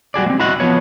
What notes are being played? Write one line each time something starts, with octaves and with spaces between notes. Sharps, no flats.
G3 F#4 G#4 D5
G#3 C4
E4 F#4 D#5 F#5
F3 B3 C#5